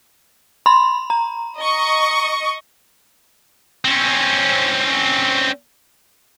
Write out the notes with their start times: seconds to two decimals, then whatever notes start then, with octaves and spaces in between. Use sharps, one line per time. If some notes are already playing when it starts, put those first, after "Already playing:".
0.66 B5 C6
1.10 A#5
1.58 D#5 C#6
3.85 C4 C#4